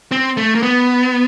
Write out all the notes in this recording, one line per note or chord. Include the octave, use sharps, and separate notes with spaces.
C4
A3
A#3
B3